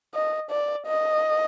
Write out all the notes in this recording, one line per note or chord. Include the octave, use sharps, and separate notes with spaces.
D#5
D5
D#5